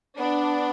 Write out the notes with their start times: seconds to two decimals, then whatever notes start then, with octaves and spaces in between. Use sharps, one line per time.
0.19 B3 D4